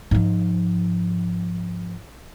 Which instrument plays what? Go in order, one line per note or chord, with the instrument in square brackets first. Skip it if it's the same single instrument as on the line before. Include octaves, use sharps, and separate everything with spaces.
[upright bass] G#2 F3